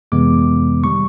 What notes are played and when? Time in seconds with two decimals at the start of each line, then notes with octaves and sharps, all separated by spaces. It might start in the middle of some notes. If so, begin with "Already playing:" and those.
0.12 F2 C3 E3 G#3 B3 D6
0.84 D#3 G3 C#6